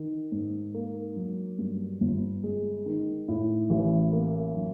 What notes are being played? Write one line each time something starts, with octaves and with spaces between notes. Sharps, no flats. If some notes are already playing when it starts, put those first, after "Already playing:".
Already playing: D#3
G#2
A#3
F#3
G2
G1
G#3
D#3
A2
A1
A#3
F#3